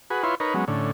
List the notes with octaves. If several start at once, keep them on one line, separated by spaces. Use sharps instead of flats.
F#4 G#4 B4
E4 F4 B4 C#5 C6
D#4 A#4 B4 C#5
F#3 G#3 B3 C#4
A2 D3 C#4